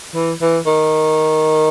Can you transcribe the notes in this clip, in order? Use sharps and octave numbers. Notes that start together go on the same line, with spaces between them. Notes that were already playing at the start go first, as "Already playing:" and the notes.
E3
E3
D#3